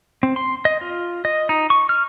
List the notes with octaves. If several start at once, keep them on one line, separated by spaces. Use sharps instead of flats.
C4
C6
D#5
F4
D#5
D#4
C#6
F6